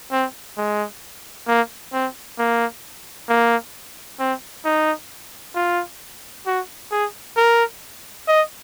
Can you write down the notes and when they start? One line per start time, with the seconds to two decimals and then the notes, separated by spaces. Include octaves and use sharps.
0.12 C4
0.57 G#3
1.48 A#3
1.93 C4
2.38 A#3
3.29 A#3
4.19 C4
4.65 D#4
5.55 F4
6.47 F#4
6.92 G#4
7.37 A#4
8.28 D#5